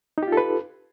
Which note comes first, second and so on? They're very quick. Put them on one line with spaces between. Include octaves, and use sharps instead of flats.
D#4 G4 F4 A4 B4